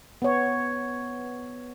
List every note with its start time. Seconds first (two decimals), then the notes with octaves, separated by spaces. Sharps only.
0.22 B3 C#5